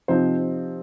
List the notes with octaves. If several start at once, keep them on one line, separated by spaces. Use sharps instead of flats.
C3 F3 C4 D#4 C5